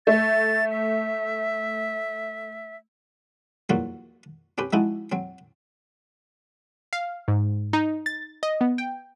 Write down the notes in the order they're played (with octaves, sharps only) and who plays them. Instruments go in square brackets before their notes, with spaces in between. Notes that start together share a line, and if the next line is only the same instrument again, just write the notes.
[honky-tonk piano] A3 [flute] A6
[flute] E5
[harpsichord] E2 G2 F#3 A#3 F4 F#4
C4 C#4 G4 B4
F3 G#3 C4 D#4 E4 F#4
F#3 C4
[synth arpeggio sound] F5
G#2
D#4
A6
D#5
B3
G5